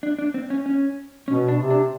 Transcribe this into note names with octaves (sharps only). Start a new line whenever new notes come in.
D4
D4
C4
C#4
C#4
B2 C#4
D4
C3
D4